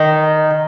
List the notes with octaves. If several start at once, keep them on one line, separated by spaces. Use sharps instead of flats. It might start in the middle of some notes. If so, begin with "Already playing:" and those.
Already playing: D#3